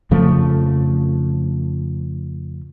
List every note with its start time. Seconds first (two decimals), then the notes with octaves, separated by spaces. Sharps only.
0.11 F2 C#3 F3 A3